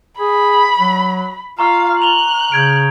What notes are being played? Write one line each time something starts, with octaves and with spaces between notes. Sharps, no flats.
G#4 B5
F#3
F4 F5 A#5 C#6 F6
A#5 F#6 F7 G7
C#3 G6 G#6 D7